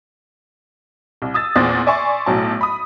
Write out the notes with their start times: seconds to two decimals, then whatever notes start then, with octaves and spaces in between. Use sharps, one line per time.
1.22 C2
1.34 D#6 E6 A6
1.56 E2 A#2 C4 G#4 A6
1.87 D5 E5 G#5 C6 C#6
2.26 B1 A2 F#3 A5
2.61 B5 D#6